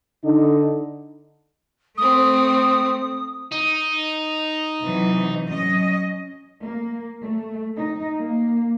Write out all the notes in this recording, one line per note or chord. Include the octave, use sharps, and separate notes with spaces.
D3 D#4
A3 C4 D#6
D#4
C3 E3 F#3
F#3 C#4 D#5
A#3
A3
D#4
A#3